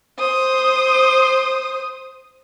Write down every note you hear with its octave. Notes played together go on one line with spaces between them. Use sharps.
C5 D#6